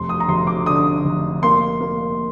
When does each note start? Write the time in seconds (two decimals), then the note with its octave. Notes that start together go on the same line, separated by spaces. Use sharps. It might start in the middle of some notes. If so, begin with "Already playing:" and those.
Already playing: F1 C6
0.09 D#6
0.20 A#5
0.28 F1 C6
0.47 D6
0.66 D3 D#6
1.05 F1
1.43 A#3 C6
1.81 A#3